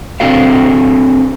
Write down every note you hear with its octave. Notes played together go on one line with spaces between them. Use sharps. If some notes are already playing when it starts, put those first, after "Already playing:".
C4 D4 F#4 A4 F5